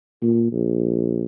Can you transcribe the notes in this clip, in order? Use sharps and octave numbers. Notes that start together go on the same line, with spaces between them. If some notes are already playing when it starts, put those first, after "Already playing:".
A#2
A#1